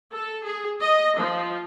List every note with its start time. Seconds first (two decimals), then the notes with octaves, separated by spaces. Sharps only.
0.13 A4
0.45 G#4
0.82 D#5
1.20 F3